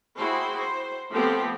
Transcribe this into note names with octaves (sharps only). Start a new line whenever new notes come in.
E4 F#4 G#4 C5 G5
C5
F3 A3 B3 C4 G4